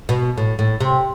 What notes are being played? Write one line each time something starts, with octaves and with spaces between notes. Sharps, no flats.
B2
A2
A2
C3